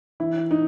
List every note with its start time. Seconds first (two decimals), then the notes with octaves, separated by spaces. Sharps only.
0.20 E3 E4
0.51 D#4